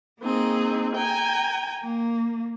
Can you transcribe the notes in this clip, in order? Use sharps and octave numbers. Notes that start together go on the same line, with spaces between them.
A#3 C4 D#4 G#4
G5 G#5 A#5
A#3